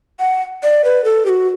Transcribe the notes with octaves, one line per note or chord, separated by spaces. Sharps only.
F#5
D5
B4
A4
G4
F#4